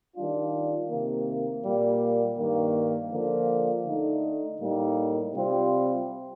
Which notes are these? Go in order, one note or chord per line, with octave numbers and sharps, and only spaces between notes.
D#3 G3 D4 F4
C3 D#3 A#3
A#2 G3 A#3
G2 D#3 A#3
D3 F3 A#3 F4
D3 A3 D#4
A2 G3 A#3 D#4
C3 G3 C4 F4